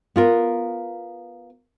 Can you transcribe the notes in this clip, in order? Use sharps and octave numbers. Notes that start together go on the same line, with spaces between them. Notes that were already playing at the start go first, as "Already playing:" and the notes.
B3 F4 A#4